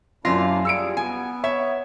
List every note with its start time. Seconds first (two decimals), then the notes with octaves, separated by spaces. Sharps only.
0.25 F#2 A#3 D4 E4 F4 A#6
0.65 G3 G#4 E6 C#7 D7
0.97 B3 G#5
1.44 C#5 E5